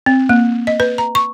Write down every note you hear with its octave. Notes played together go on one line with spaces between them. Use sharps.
C4
A#3
D#5
B4
A#5
C#6